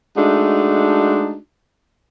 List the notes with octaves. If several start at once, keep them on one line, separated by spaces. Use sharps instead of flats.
G#3 A3 D4 D#4 F#4